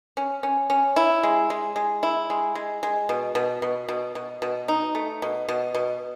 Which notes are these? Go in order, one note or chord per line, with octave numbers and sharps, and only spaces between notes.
C#4
C#4
C#4
E4
G#3
G#3
G#3
E4
G#3
G#3
G#3
B2
B2
B2
B2
B2
B2
D#4
A3
B2
B2
B2